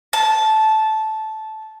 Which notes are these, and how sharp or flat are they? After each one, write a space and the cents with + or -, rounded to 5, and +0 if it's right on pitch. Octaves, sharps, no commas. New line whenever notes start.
A5 -10